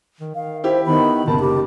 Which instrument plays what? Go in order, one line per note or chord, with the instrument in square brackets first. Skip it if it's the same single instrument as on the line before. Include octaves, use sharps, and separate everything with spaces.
[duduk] D#3
[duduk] D#3 [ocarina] F5
[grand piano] E4 G4 [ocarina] C5
[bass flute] D#3 [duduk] B3 [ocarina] B5
[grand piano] F#1 D#3 A5 [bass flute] B3
[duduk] C3 [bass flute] G4